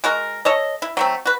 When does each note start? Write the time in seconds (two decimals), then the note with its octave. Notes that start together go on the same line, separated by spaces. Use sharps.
0.04 G#3 F#4 A#4
0.45 A4 C#5 D#5
0.82 E4
0.97 F#3 A3 C4
1.25 F#4 B4